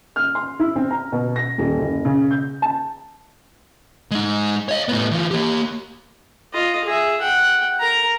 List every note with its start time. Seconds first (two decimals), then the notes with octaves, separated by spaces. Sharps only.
0.16 F6
0.35 C6
0.59 E4
0.76 C4
0.91 A#5
1.12 B2
1.36 A#6
1.58 D#1
1.79 F#1
2.05 C#3
2.31 G6
2.62 A5
4.11 G#3 D#4
4.69 C#5 D#5
4.88 A2 B3
5.11 E3 F4
5.31 A#3 G4
6.53 F4 D#5
6.84 G#4 E5
7.22 F#5 G5
7.80 A#4 A#5